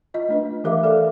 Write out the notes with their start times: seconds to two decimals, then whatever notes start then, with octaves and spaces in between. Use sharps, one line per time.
0.14 F4 D#5
0.29 A3 D4 B4
0.64 E3 G4 A#4 E5 F5 D6
0.83 A4 D5 E5 F5